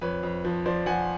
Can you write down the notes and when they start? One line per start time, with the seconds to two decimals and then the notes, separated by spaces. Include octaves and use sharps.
0.01 F2 B4 C#5
0.23 F2
0.45 F3
0.65 F3 C5 D5
0.86 F3 F#5 G#5